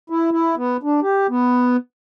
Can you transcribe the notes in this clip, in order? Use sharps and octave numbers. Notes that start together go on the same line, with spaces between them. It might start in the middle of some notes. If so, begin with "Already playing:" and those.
E4
E4
B3
D4
G4
B3